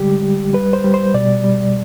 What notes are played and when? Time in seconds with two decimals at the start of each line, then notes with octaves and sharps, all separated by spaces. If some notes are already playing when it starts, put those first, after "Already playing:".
Already playing: D3 G3 G#3 G4
0.23 G3
0.53 G3 B4
0.73 C5
0.84 G3
0.94 C5
1.14 B2 D5
1.44 G3